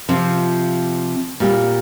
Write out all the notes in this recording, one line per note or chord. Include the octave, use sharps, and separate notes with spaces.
C3 F3 C4 F4
A#2 G3 C4 G4